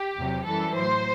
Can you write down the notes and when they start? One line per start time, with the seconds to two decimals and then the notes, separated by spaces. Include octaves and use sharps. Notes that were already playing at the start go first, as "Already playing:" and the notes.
Already playing: G4
0.17 E2 C3 F#3
0.46 F#2 E3 G3 A4
0.75 A2 F#3 C5